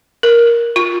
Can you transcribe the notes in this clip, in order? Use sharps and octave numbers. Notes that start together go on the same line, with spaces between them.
A#4
F4